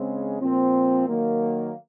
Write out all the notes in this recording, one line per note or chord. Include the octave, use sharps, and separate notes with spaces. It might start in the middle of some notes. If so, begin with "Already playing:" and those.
Already playing: C#3 G#3 C4
A#2 F3 C4
D#3 F#3 A#3